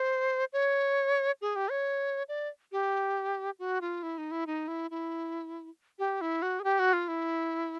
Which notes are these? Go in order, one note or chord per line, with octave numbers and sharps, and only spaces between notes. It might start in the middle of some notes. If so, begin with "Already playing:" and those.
Already playing: C5
C#5
G#4
G4
C#5
D5
G4
F#4
F4
E4
D#4
E4
D#4
E4
E4
G4
E4
F#4
G#4
G4
F#4
F4
E4